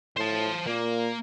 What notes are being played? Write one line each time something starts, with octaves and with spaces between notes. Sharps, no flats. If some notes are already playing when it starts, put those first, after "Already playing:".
A2 C5 A5
A#2 A#3